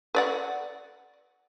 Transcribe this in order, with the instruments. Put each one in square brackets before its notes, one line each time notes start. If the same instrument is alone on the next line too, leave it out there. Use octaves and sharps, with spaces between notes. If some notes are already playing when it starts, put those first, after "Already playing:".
[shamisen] B4 D5 F#5